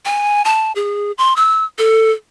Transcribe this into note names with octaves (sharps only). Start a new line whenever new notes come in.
G#5
A5
G#4
C6
E6
A4